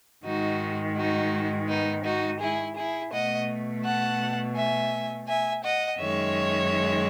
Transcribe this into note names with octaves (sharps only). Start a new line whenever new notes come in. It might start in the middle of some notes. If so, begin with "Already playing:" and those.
G#2 D#3 G#3 D#4 F#4
D#4 F#4
B3 D#4
D#4 F#4
E4 G#4
E4 G#4
B2 A3 D#5 F#5
F#5 A5
E5 G#5
E5 G#5
D#5 F#5
F#2 D#3 G#3 C#5 E5